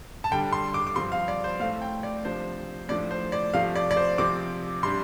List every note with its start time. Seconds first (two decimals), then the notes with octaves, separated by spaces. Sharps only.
0.24 A5
0.31 D3 G3 D4 G5
0.53 C6
0.74 D6
0.87 D6
0.96 G2 F3 C4 C6
1.12 F5
1.28 D5
1.44 C5
1.60 A2 A3 C4 F5
1.82 G5
2.03 D5
2.25 C3 F3 D4 C5
2.89 A2 F3 D4 D5
3.11 C5
3.32 D5
3.54 C3 F3 A3 F5
3.75 D5
3.91 D5
3.97 C5
4.18 C3 F3 C4 D6
4.83 C3 G3 D4 C6